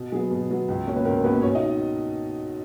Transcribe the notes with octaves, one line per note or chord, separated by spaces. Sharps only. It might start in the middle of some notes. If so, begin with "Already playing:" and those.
Already playing: B2
F#3 B3 G#4
B2
F#3 B3
C#2
B2 A#3 C#4 C#5
B4
C#2 A#4
B2 A#3 B3 C#4 B4
B2 C#4 C#5
D#4 D#5